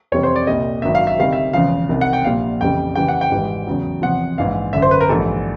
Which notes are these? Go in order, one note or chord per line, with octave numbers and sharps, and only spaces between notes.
F2 C3 E3 G3 C#5
C5
D5
C2 A#2 G3 D#5
G#1 G2 D#3 F#3 E5
F5
E5
D2 C3 D#3 G3 F5
E5
E1 E2 C#3 F3 F5
C2 C3 D#3
F#5
G5
A#1 A#2 G3 F5
F2 C#3 E3 G3 G5
D#2 C#3 E3 G3 G5
F#5
G5
G#1 G#2 E3 G3
E2 C#3 F#3
E2 C3 F3 F#5
A#1 G#2 E3 F5
G1 F#2 D3 E5
C5
B4
A#4
A#1 G#2 E3 G3 A4